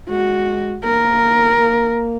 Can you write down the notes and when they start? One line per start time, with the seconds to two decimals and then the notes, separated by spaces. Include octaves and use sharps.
0.09 G#3 F#4
0.84 A#3 A#4
1.58 A#3